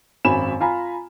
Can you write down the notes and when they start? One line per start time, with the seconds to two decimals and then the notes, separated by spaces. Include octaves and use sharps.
0.25 G#1 F#2 G#5 B5 E7
0.60 F4 G#5 A#5 B5